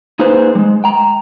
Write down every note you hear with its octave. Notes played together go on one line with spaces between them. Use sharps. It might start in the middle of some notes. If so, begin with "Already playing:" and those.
A#3 D#4 G#4 B4 C5
G3 G#3
G5 A#5